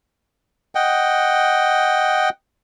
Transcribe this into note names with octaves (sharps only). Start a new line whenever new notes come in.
D#5 F#5 G5